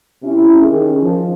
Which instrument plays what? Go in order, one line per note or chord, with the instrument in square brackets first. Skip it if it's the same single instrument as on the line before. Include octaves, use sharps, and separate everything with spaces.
[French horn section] C3 C#4 E4
D#3 C#4 G#4
F3